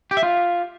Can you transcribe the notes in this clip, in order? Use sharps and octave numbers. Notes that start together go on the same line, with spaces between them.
G4
E5
F4